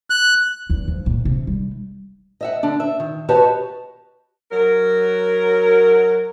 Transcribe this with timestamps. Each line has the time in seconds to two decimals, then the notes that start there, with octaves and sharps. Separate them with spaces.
0.10 F#6
0.70 E2
0.88 F3
1.06 A#1
1.25 C3
1.47 G3
2.41 D#5 E5 F#5
2.63 D3 D4
2.80 E5
3.00 D#3
3.29 F#4 G4 B4 C#5 D#5 A5
4.52 F#3 A#4